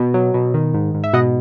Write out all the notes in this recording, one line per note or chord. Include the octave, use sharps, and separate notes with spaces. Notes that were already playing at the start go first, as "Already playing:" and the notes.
Already playing: B2
F#3
B2
D#3
G#2
G#2
E5
B2 D#5 F#5